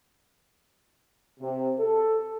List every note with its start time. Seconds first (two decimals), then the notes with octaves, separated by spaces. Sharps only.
1.40 C3
1.79 A4